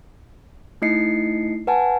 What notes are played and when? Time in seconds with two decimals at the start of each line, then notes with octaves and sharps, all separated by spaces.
0.82 A3 D#4 E4 D#5 C7 C#7
1.67 B4 F#5 G#5 A5